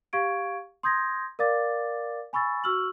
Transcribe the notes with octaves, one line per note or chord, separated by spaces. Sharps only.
G4 F5 C#6 G#6 D7
C6 D#6 G6 G#6 A#6
A#4 D5 F5 D6 A6
G#5 B5 C#6 E6 A6
F#4 C#6 E6 F6 F#7